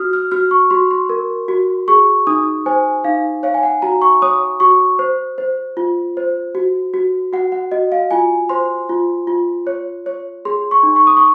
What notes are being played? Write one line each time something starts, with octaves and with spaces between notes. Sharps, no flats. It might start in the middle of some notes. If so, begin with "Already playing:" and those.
Already playing: F#4 D#6 F6
F6
F#4 F6
C#6
F#4 C6
C6
A#4
F#4
G#4 C#6
D#4 D#6
C5 G#5
D#4 F5
C#5 F5
G#5
F#5
F#4 A#5
C#6
C#5 D#6
F#4 C#6
C5
C5
F4
C5
F#4
F#4
F#4 F#5
F#5
F#4 D#5
F5
F4 G#5
C5 C6
F4
F4
C#5
C#5
G#4 C6
C#6
D#4
C#6
D#6
C#6